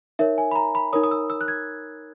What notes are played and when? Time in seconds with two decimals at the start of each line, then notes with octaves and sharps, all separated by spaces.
0.19 D#4 A#4 C#5 E5
0.38 G#5
0.51 B5
0.56 A#5
0.75 B5
0.93 D#4 A#4 C#5 D#6
1.03 D#6
1.11 E6
1.30 E6
1.41 F#6
1.48 G#6